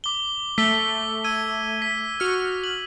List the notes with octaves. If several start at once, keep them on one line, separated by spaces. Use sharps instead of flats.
D6 G7
A3 B6 G7
E6 G#6 D#7
B6
F#4 F6
F#7